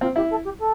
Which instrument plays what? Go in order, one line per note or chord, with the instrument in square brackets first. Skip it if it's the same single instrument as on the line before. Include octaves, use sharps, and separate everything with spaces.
[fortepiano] C4 [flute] F4
[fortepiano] E4 [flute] G4
[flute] A4
G4
A4